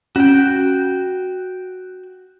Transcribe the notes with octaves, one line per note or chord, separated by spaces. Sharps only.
C#4 F#4 G5